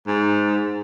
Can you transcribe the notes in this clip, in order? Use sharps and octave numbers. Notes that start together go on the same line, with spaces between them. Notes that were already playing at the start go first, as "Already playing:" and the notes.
G#2